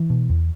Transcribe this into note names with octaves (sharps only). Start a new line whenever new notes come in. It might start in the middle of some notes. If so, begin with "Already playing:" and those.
Already playing: E3
B2
E2